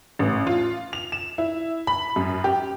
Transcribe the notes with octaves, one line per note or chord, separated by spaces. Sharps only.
A1
F4
F7
E7
E4
B5
F#2
G4